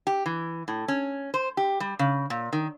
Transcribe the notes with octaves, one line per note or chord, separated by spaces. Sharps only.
G4
E3
A2
C#4
C5
G4
G3
C#3
A#2
D#3